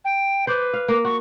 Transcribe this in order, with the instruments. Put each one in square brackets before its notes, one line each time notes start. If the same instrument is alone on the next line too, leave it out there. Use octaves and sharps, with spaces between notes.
[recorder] G5
[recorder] B4 [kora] C5 D5
[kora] F5
A#3
[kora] F#4 [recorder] C#6